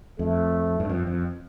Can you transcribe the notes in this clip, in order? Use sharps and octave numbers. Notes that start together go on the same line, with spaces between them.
F2 A3
G2
F2
F2